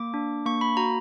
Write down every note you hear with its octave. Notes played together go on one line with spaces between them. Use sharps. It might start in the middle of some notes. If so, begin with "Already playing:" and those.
Already playing: A#3 D6
D4
A#3 C#6
B5
F#4 A#5